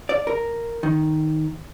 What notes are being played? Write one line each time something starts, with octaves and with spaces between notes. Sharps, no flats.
D5
A#4
D#3